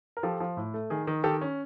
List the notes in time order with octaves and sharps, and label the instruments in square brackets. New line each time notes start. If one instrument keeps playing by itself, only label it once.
[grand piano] A#4
F3 G4 A4
F3
A2
A3
D#3 G#4
D#3
D#3 G4 A4
C#4